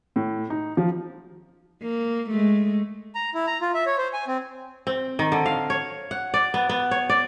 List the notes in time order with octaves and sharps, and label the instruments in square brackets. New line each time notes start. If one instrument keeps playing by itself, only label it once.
[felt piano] A2
D#4
F3
[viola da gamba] A#3
G#3 A3
[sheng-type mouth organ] A#5
E4
A#5
F4
E5
C#5
C5
G#5
C4
[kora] C4
D#3
D3
F5
C#5
F#5
D5
B3
B3
C#5
D5